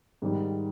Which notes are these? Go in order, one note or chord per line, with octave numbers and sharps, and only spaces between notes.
G#2 D#3 G3